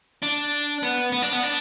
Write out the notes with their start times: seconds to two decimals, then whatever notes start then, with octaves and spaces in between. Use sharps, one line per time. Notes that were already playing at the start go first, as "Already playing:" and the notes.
0.22 D4
0.83 B3
1.12 B3
1.22 D4
1.33 B3
1.43 D4